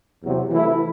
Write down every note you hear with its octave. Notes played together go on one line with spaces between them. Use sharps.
E2 C3 F#3
E3 A3 E4